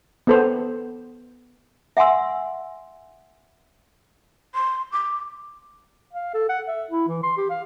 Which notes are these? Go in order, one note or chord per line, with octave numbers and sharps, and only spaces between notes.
B3 A4 C5
E5 F#5 G#5 C6 E6
C6
D6
F5
A4
F#5
E5
E4
E3
C6
G4
F5